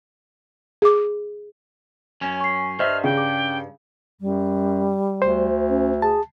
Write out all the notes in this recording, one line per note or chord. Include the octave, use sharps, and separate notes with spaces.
G#4 D6
F#2 C#4
C#6 C7
G2 C5 D#5 E5 F6
C#3 G#4 G5
D6
F#2 G3
D2 C5
C#4
G#4 A5